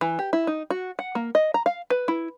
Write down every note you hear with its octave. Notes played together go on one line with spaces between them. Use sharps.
E3
G4
E4
D#4
F#4
F#5
A#3
D#5
A#5
F5
B4
E4